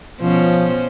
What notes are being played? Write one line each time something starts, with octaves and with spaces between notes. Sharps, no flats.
B2 F3 C#4 C5